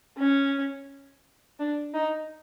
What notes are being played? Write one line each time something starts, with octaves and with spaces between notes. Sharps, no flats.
C#4
D4
D#4